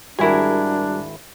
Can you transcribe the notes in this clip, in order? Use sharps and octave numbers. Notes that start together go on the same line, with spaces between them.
G#1 G3 D4 E4 F#4 G#4 A#4